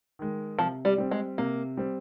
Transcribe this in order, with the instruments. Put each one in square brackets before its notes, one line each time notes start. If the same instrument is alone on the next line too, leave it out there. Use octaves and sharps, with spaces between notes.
[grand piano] D#3 G#3
[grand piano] C3 [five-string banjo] F3
[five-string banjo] G3
[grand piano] G3 C4
[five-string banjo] G#3
[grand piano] C3 [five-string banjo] A#3
[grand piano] G3 C4